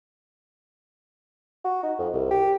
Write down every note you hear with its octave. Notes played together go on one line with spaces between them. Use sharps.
F#4
D#4
F2
C2
G4